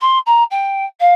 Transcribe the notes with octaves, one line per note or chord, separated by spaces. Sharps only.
C6
A#5
G5
F5